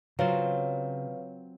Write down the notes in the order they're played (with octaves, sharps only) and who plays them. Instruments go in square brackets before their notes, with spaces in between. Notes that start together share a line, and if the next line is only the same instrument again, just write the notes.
[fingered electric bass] C#3 [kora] F#3 C4 F4 [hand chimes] B4 C#5 F5